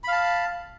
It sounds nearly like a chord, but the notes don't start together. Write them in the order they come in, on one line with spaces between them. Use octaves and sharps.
B5 F5 A5